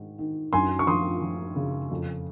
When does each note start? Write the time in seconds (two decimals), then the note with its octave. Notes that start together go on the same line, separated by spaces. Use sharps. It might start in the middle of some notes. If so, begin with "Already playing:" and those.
Already playing: G#2 D#3
0.19 D#3
0.53 F#2 G#5 C6
0.79 C#6
0.87 F3 C6 D#6
1.22 F3
1.56 C#3
1.91 F2